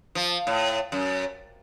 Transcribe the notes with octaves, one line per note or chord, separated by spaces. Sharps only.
F3
A2
F#2